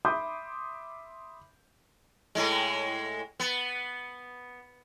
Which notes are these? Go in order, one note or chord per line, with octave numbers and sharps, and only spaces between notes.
E5 B5 C6 D6 D#6 G6
A2 G#3
B3